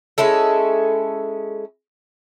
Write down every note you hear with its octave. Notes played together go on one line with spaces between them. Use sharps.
G#3 C#4 E4 A4